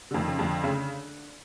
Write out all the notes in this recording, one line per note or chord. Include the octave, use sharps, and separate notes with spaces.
D3
F2 D#3
C#3
F2 D3
C#3